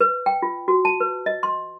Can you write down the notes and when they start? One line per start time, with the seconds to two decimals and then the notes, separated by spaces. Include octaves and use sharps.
0.01 B4
0.26 G5
0.42 F4
0.68 F#4
0.85 A5
1.00 B4
1.26 D#5
1.43 C6